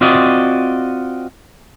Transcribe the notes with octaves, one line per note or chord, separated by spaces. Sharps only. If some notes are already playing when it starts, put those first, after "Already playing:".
C4 F4 F#4 D5 D#5